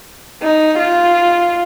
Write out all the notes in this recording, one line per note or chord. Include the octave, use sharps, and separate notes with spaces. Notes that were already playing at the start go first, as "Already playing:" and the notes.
D#4
F4